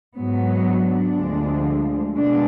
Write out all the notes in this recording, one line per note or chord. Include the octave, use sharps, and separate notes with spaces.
G#2 F#3 B3
D4
D2 D3 F3 G#3
B2 G#3 B3 D4